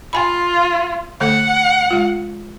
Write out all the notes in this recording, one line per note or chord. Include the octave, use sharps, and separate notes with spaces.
F4 G5 G#5 B5
D3 A3 A4 F#5
G#3 F4